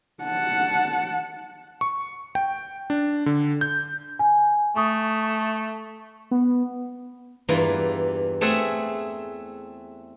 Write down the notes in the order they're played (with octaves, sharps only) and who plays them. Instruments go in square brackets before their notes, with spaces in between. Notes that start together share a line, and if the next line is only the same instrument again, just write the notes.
[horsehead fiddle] F#5 A5
[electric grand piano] C#6
G5
D4
D3
G6
[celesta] G#5
[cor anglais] A3 [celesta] C#6 D#6
[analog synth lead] B3
[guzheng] E2 G2 E3 A#3 F4 A#5
A3 C4 G#4 A4 E5 F#5